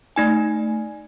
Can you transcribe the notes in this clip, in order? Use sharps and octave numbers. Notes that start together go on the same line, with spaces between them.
A3 D#4 G#5